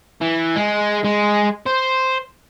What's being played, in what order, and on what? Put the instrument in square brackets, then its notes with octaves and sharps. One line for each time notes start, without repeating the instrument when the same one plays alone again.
[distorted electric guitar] E3
G#3
G#3
C5